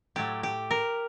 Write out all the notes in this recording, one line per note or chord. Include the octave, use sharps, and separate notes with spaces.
A2 F#3 A3 G4
G4
A#4